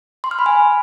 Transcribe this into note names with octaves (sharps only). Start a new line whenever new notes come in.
C6
F6
B5
G#5